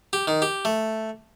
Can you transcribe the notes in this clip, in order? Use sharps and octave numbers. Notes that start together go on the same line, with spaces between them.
G4
D#3
G4
A3